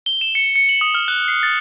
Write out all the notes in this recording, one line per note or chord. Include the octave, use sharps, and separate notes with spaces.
G7
E7
C#7
C#7
F#7
D#6
F6
F#6
C7
A6